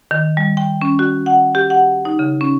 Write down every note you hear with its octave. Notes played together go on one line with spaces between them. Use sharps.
D#3
G3
G5
C#4
F#4
F#5
G4
F#5
D#4
C#3
C#4